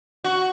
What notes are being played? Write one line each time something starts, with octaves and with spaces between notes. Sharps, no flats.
F#4